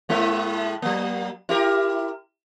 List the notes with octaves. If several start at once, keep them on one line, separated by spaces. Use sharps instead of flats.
A2 G#3 E4
F#3 A#3
E4 G4 A#4